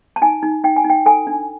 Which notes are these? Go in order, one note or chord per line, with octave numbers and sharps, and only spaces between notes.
A5
D#4 G#5
D#4
D#4 G5
G#5
D#4
G5
A4 G#5
D4